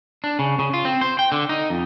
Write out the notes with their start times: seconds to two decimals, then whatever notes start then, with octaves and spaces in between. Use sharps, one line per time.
0.24 D4
0.39 C#3
0.59 C#3
0.74 F4
0.85 C4
1.01 C5
1.19 G5
1.32 D3
1.49 D#4
1.70 F2